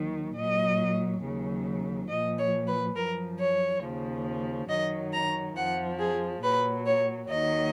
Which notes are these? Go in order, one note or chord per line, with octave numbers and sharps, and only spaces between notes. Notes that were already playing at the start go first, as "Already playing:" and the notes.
Already playing: D#2 D#3 F#3
A#2 F#3 D#5
D#2 C#3 F#3
A#2 F3 D#5
C#5
B4
F#2 F3 A#4
C#5
D#2 C#3 F3
F#2 D#3 F#3 D#5
A#5
F2 F3 F#5
G#4
A#2 F#3 B4
C#5
D#2 D#3 F#3 D#5